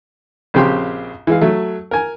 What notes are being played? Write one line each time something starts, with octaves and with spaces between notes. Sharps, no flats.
A#1 C#3 C4 G4 G5 C6
E3 G#3 F5
F#3 A3
A#4 G#5